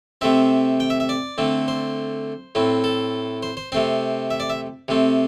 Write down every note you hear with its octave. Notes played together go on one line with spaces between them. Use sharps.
C3 A3 C4 E5
G5
E5
E5
D5
D3 A3 C4
C5
A2 A3 C4
A4
C5
C5
C3 A3 C4 C5
E5
D5
E5
C3 A3 C4